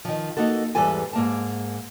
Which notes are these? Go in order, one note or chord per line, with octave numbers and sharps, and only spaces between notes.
D#3 F3
A#3 D#4 F#4 A4
E2 G#2 E3 G3 A4 G#5
G#2 A#3 A5